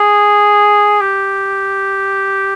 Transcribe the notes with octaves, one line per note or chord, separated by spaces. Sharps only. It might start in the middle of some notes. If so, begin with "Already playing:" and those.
Already playing: G#4
G4